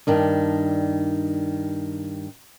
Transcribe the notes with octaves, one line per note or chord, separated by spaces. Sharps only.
G2 D#3 D4